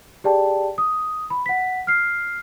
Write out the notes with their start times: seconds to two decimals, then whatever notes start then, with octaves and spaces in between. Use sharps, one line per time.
0.24 G4 G#4 D5 G5 A5
0.78 D#6
1.30 B5
1.46 F#5 B6
1.87 F6 C7